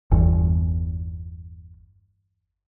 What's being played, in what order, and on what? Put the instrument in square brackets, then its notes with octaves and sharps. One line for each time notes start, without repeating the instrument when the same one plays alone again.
[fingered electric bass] G1 E2